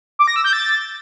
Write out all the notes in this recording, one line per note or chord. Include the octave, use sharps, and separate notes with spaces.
D6
A#6
E6
G6
A6